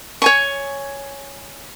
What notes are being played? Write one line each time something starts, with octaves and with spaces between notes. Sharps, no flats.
C#5 G#5 C#6